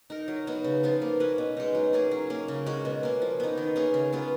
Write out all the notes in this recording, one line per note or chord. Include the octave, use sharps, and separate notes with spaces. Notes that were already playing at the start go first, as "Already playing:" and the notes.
D#4 A#4
F#3
B3 D#4 F#4
C#3
F3 B3 F4
A#3
C#4 F#4 B4
B2
G#3 D#4
F#3
A#3 C#4 G#4
F#3
A#3 C#4
C#3
G#3 C#4 F#4
B2
A#3 C#4
F3
B3 D#4
D#3
A#3 C#4 G#4
C#3
F#3 B3 F4